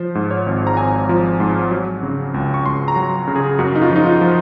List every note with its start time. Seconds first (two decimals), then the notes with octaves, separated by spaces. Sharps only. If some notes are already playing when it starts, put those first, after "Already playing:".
Already playing: F3 C5
0.15 G#2
0.31 C#5
0.46 G#1
0.67 A#5
0.77 G#1 G#5
1.09 F3
1.40 G#2
1.71 F#3
2.03 C#3
2.34 C#2
2.54 C#6
2.65 C#2 C6
2.88 A#5
2.96 F#3
3.27 C#3
3.36 G#4
3.59 F#2 F#4
3.75 D#4
3.82 F4
3.90 F3
3.96 D#4
4.06 F4
4.21 F3